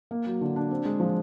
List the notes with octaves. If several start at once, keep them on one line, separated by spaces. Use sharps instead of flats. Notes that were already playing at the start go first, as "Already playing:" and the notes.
A#3
F#3
D3
D4
C4
G#3
F3